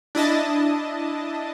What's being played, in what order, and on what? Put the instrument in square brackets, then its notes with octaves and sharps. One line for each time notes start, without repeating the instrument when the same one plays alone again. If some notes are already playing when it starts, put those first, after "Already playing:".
[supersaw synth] D4 E4 D#5 A5